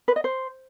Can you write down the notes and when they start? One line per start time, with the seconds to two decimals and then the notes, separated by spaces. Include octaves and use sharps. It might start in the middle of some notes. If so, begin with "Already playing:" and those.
0.08 B4
0.16 D#5
0.24 C5